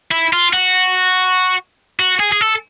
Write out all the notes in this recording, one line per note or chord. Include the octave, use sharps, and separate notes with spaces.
E4
F4
F#4
F#4
G#4
G#4
A4